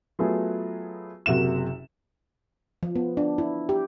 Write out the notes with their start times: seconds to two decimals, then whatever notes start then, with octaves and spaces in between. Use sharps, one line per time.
0.19 F#3 A3 B3 F4 G#4
1.26 F#1 C3 A#3 F#4 E5 E7
2.83 F3
2.96 B3
3.17 D4
3.38 E4
3.69 G4